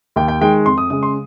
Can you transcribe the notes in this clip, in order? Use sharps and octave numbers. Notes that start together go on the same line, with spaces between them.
D#2 G5
G5
D#3 G#3 G5
F2 C6
D#6
C#3 G#3 D#6
C6